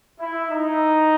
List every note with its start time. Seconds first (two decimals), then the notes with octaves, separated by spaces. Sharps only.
0.20 E4
0.50 D#4